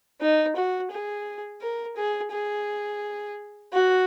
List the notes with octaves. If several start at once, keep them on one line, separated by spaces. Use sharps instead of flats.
D#4
F#4
G#4
A#4
G#4
G#4
F#4